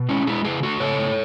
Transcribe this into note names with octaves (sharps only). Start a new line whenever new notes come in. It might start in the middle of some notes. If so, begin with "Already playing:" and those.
Already playing: B2
G#3 C#4 E4
G#3 E4 G#4
C#3 E4 G#4
A3 F#4 A4
C#3 A4 C#5
A3